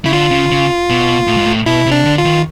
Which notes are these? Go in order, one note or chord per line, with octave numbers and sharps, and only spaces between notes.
C#3 E4
D3 F4
C#3
C#3
B2
A2
G#2
A2
B2 E4
C3
D4
D3
F4
D#3